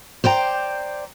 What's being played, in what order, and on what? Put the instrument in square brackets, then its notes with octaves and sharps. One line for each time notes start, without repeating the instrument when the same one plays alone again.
[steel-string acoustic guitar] C5 D5 G5 A#5